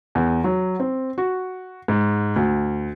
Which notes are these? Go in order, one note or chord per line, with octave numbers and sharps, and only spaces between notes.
E2
F#3
C4
F#4
G#2
D2